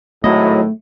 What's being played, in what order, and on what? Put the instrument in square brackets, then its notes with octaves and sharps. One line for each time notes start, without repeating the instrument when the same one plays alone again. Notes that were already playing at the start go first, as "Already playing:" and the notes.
[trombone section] G#1 A2 [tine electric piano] F#3 E4 D#5 [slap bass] A3